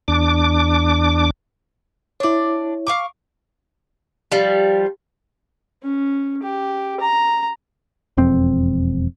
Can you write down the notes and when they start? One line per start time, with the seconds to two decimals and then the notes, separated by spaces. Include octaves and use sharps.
0.08 E2 D4 D6
2.20 D4 E4 C#5 D5
2.87 F5 C#6 D6
4.32 F3 G3
5.83 C#4
6.43 G4
7.00 A#5
8.17 E1 F2 C4